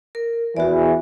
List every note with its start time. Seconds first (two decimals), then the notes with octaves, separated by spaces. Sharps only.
0.15 A#4
0.57 E2 E3 F#4 D5